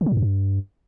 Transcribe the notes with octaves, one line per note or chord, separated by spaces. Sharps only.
D3
F#3
G#2
F#2
G2